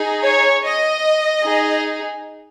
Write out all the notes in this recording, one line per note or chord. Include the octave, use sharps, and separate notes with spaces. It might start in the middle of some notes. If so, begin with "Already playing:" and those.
Already playing: D#4 G#4
C#5
D#5
D#4 G#4